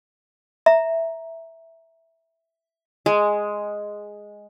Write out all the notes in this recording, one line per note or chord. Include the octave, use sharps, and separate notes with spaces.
E5 A#5
G#3